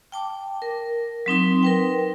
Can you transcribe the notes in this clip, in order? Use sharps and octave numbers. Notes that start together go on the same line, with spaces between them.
G5 A5 D6
A#4
F#3 C4 D#4 C6
A#4 B4 G5